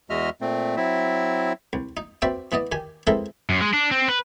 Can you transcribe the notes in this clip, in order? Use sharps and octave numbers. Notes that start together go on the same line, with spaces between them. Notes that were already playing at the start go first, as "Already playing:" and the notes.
E2 G#3 F#4 D#5 E5 F6
A#2 A3 C4
F#3 C4 E4 E5
C2
D#4
C4 F#4 B4 D5 E5 G5
E3 B3 D5 D#5
D#3 G4 G#5
E3 G#3 C4 A4 A#4 E5
F#2
G#3
D4
C4
B4